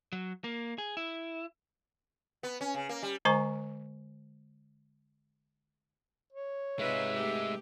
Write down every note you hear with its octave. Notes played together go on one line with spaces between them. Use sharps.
F#3
A#3
G#4
E4
B3
C#4
C#3
A#3
G3
D3 G#3 C5 G#5 A#5 C#6
C#5
C3 G#3 D#4 F4 B4 E5
A3 G4